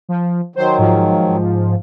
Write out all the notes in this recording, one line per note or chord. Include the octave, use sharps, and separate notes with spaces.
F3
D#3 F#3 C5
G#2 F3